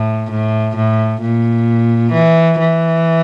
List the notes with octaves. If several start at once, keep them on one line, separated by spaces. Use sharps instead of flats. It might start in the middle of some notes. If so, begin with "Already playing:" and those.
Already playing: A2
A2
A2
A#2
E3
E3